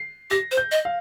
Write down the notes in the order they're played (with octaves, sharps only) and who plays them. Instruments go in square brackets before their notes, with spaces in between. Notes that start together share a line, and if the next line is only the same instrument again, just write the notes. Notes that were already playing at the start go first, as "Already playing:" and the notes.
Already playing: [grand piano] C7
[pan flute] G4 [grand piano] A#6
[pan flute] C5
[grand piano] G6
[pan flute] D#5
[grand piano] F5